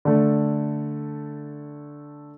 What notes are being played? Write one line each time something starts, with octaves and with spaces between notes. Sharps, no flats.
D3 A3